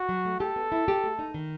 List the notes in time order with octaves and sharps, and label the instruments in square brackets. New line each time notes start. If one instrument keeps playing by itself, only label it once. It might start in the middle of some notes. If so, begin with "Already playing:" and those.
Already playing: [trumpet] F#4
[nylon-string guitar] F#3
A3
[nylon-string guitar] G4 [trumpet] A4
[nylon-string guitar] B3
E4
G4
A3
D#4
D#3